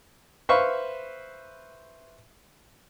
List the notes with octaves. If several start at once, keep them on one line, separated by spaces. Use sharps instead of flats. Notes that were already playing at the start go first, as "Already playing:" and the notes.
B4 C5 E5 F5 C#6